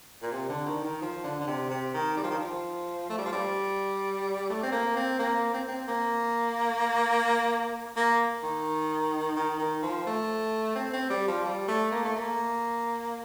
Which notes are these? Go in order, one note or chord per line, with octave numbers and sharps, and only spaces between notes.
A#2
C3
D3
D#3
D#3
F3
D3
D3
C3
C3
D#3
G3
F3
D#3
F3
A3
G3
F3
G3
A3
C4
A#3
C4
A#3
C4
C4
A#3
A#3
D#3
D#3
D#3
F3
A3
C4
C4
G3
F3
G3
A3
A#3
A3
A#3